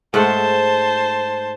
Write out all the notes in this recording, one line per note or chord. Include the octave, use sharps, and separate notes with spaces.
G#2 A3 C5 F#5 A5